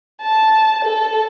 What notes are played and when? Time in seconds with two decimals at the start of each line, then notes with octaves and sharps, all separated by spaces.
0.21 A5
0.85 A4